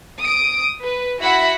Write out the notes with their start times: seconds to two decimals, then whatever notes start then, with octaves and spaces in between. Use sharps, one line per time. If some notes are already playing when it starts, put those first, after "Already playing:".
0.20 D#6 D7
0.82 B4
1.20 E4 F#4 E5 F#5 B5